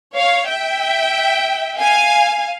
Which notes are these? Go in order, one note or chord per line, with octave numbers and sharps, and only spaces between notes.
C#5 F5
E5 G5
F5 G#5